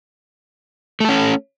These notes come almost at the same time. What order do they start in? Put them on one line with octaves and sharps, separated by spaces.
A3 A4 C#4